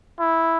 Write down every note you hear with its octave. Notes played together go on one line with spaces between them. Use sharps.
E4